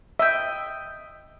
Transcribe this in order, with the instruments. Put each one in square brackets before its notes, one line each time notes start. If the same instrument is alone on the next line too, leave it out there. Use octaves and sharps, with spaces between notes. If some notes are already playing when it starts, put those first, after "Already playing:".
[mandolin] D#5 G5 [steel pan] E5